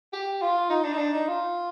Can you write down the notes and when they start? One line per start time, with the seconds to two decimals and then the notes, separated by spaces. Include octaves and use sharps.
0.13 G4
0.42 F4
0.70 D#4
0.84 D4
0.93 D#4
0.98 D4
1.13 D#4
1.28 F4